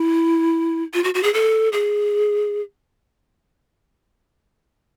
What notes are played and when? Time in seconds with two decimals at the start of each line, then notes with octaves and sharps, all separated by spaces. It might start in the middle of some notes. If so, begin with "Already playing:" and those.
Already playing: E4
0.94 F4
1.04 F#4
1.15 F#4
1.23 G#4
1.34 A4
1.73 G#4